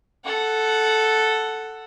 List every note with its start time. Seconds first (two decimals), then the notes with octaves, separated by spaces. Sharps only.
0.25 A4 F#5